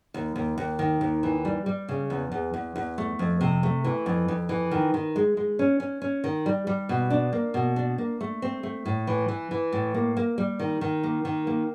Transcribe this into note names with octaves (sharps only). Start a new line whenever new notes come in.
D#2
D#2
D#2
D#3
D#2
E3
G3
G3
C#3
E2
E2
E2
E2
A3
F2
C3
A3
E3
F2
F2
E3
D#3
D#3
G#3
G#3
C#4
C#4
C#4
D#3
G3
G3
B2
D4
A#3
B2
D4
A#3
A3
C4
A3
A2
E3
E3
E3
A2
A#3
A#3
G3
D#3
D#3
A#3
D#3
A#3